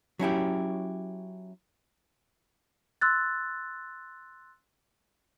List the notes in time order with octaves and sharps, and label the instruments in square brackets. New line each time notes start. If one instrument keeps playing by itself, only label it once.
[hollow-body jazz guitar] F#3 C#4 E4 G4
[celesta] C6 E6 F#6 A6